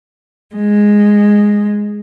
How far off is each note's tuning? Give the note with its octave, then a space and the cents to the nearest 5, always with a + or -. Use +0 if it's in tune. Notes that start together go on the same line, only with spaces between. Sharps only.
G#3 -5